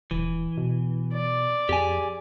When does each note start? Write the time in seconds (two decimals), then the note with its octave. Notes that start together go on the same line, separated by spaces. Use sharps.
0.11 D#1 E3
0.57 B2
1.14 D5
1.69 F2 G4 G#4 G#5